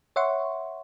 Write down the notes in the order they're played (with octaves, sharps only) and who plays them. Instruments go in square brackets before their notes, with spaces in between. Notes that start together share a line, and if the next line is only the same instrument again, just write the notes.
[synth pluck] C#5 E5 F#5 C6 C#6